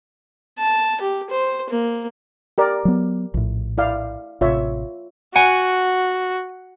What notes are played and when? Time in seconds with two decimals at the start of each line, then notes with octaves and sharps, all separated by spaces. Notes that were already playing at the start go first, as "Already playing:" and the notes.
0.59 A5
1.01 G4
1.30 C5
1.70 A#3
2.58 G4 A#4 D5
2.85 F#3 B3
3.34 A#1 A2
3.78 E4 D5 F5
4.41 A1 C3 F4 C#5 E5
5.36 F#4 F#5 G#5